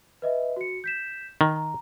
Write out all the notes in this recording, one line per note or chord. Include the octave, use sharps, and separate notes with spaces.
B4 D#5 E5
F#4 C#7
G6 B6 E7
D#3 A#5
A#5